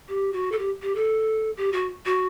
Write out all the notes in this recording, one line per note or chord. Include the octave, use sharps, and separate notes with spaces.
G4
F#4
A4
G4
G4
A4
G4
F#4
F#4